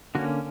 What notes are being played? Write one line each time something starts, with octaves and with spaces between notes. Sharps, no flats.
D3 A#3 C#4 F#4